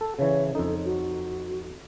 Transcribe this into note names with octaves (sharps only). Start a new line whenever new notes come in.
A4
C#3 E3 C#5
F2 D#4 A4
F#4